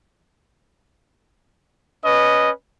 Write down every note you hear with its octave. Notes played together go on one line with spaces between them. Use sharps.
C#4 B4 D#5